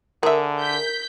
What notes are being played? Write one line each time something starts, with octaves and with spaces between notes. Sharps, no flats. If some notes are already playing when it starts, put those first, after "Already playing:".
D3 G#4 A#4 E5
G6 B6